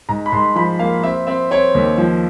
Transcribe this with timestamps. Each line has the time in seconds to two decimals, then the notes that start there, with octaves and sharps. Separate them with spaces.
0.09 G#2 A#5
0.26 B5
0.32 G#2 C6
0.56 F3 B5
0.79 A#3 F5
1.03 C4 E5
1.27 C4 E5
1.51 C4 C#5
1.75 D#2
1.98 F3